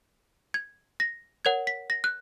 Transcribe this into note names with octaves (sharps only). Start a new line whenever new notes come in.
G#6
A#6
A#4 C#5 F#5 G#6
B6
A#6
F#6